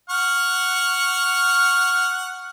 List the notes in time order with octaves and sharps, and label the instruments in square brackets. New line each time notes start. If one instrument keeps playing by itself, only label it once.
[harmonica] F#5 C#6 F6